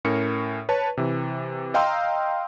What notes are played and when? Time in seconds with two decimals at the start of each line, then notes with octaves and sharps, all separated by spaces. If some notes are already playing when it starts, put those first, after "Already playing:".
0.05 A2 C#4 A#4 C#7
0.69 B4 C#5 A5
0.97 C3 E3
1.74 D#5 F5 G5 A#5 C6 E6